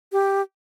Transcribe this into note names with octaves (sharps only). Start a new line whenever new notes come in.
G4